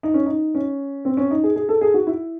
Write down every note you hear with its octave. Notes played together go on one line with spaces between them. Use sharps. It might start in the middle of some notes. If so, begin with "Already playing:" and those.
D#4
C#4
D#4
C#4
C4
C#4
D#4
G#4
G#4
A4
G#4
F#4
E4